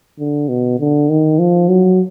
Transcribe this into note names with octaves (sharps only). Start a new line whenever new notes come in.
D3
B2
D3
D#3
F3
F#3